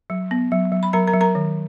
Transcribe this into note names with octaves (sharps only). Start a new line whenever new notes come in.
F#3
B3
F#3
F#3
B5
F#3 A#4 A#5
A#4 A#5
F#3
A#4 A#5
D#3